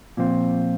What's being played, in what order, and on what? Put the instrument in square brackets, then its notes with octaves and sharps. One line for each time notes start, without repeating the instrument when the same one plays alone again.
[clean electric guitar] A#2 F3 C4 F4